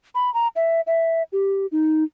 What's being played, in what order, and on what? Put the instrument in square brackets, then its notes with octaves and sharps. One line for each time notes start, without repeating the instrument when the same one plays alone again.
[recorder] B5
A#5
E5
E5
G4
D#4